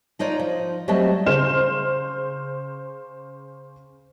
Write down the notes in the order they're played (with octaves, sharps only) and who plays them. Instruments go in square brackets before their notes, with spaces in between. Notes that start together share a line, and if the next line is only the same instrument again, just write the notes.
[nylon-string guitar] D4 D#4 F4 C#5 D5
F3
F#3 G3 A3 C4 D#5 A5
[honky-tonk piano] C#3 C5 F6 E7